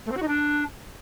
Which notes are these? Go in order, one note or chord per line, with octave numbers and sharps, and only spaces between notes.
A3
C4
F#4
D#4
D4